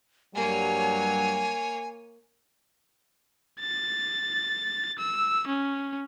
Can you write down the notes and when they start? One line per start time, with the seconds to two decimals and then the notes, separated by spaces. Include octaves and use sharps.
0.35 G2 F#3 G3 A#3 C#5 G#5
3.60 A6
4.99 E6
5.48 C#4